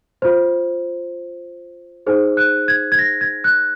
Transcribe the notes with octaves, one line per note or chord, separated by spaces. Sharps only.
F4 C5
D#4 G#4 C5
F#6
G#6
G#6
A#6
G#6
F#6